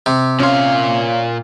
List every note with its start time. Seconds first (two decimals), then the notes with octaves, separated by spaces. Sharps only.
0.06 C3
0.40 A#2 C#4 F5 C6